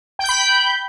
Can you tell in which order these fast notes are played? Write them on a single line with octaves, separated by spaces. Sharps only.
G5 G6 B5